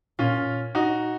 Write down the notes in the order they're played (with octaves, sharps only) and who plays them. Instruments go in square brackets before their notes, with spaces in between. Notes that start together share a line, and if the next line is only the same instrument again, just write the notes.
[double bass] A#2 [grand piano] C#4 F4
[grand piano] D#4 F#4